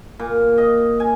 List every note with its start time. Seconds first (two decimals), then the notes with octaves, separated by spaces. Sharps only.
0.20 A#2
0.58 D#5
1.00 G#5